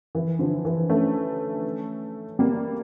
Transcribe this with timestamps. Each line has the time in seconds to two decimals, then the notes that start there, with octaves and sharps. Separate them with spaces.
0.15 E3
0.39 D3 F3
0.65 E3
0.89 A3 C#4
2.39 G3 A#3